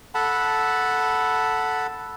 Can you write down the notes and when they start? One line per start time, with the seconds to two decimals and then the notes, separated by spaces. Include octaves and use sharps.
0.15 A4 F#5 A5 B5